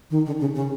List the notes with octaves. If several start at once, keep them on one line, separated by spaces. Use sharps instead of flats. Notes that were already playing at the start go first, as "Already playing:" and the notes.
D#3
D3
C#3
C#3